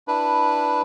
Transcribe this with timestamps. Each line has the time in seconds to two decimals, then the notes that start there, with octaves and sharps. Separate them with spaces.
0.08 D4 E4 B4